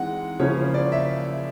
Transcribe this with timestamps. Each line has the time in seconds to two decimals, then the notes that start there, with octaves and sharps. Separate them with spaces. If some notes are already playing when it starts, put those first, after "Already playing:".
Already playing: E3 G#3 C4 D#4 F#5
0.40 C#3 F3 A#3 C#4 E4 C#5
0.57 C5
0.74 D5
0.92 E5